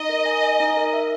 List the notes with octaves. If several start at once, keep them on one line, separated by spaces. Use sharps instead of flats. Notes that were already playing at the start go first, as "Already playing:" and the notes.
Already playing: D#4 D#5
A#4
G#5
G#5
D#4
A#4
E5